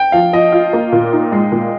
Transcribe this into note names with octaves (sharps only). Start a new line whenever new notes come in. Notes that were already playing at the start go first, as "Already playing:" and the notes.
Already playing: G5
F3 F5
F3 D#5
F4
A#3
A#2
D#4
G#3
A#2